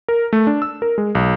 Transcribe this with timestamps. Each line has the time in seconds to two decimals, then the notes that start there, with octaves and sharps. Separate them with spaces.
0.08 A#4
0.33 A3
0.47 D4
0.62 E6
0.82 A#4
0.98 G#3
1.15 B1